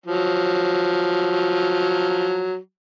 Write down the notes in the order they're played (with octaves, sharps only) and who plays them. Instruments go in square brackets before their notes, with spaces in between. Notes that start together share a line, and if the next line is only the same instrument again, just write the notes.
[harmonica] F3 F#3